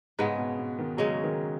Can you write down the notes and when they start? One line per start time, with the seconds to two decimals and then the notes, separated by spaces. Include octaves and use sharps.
0.19 G#2 C#3 G#3 B3
0.38 B2
0.59 B2
0.79 D#3
0.97 C#3 F#3 G#3 C#4
1.24 D#3